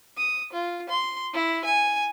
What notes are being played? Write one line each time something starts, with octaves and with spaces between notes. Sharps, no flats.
D#6
F4
C6
E4
G#5